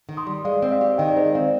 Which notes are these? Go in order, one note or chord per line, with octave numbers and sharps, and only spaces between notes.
D#3
C6 D#6
G3
G#3 D5 F5
C4
D5 F5
G4
D#3 D#5 G5
D5
G#3 C5 D#5
C4 D5 F5